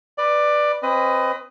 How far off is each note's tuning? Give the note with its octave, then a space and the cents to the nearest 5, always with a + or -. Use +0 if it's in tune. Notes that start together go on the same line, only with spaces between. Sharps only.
B4 +0 D5 +15
C4 +30 B4 +30 D#5 +0